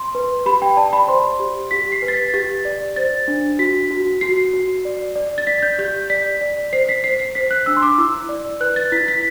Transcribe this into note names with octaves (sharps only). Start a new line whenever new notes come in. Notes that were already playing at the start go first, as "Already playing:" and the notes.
Already playing: C6
B4
G4 B5
G5
D5 A5
B5
C5 C6
G4
G4 B6
C7
B4
A6
B6
G4 A6
D5
C5 A6
D4
F#4 B6
F#4
F#4 C7
F#4
D5
D5
A6
D5 B6
G6
G4 G6
D5 B6
D5
C5 C7
B6
C5 C7
C7
C5 B6
F#6
D4 E6
C6
D6
E4 E6
D5
B4 F#6
A6
E4 B6
B6